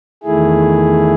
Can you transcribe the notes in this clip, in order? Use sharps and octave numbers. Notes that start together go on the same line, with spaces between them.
E2 D#3 A3 E4 G#4